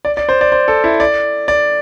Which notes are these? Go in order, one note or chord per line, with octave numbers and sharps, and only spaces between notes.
D5
D5
C5
D5
C5
A4
E4
D5
D5